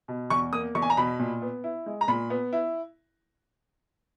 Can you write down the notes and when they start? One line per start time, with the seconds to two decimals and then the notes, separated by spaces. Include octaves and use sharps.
0.08 B2
0.30 E2 C#6
0.53 A#3 D#6
0.75 E2 C#6
0.82 G#5
0.90 A#5
0.97 B2 B5
1.19 A#2
1.42 B3
1.64 E4
1.86 G#3
2.01 A#5
2.08 A#2 B5
2.30 B3
2.53 E4